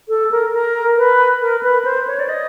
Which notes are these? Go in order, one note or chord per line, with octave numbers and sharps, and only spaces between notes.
A4
A#4
A#4
B4
A#4
B4
C5
C#5
D5
D#5